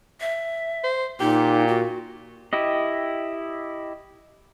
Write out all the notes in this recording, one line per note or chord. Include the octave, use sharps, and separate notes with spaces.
E5
C5
A#2 D#4 G4
F#4
E4 G4 D#5